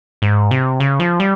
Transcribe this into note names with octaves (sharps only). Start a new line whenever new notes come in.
G#2
C3
C#3
F3
G3